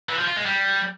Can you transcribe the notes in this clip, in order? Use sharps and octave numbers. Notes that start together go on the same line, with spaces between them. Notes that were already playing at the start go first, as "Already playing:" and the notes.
E3
F3
F4
G#3
G3